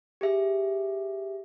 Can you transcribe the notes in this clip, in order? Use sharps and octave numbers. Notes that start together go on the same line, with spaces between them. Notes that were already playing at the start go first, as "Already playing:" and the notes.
G4 G#4 E5